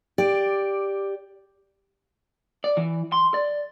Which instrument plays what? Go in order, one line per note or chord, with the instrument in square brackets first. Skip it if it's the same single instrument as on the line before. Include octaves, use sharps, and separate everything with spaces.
[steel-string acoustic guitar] G4 D5
[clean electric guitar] D5
E3
C6
D5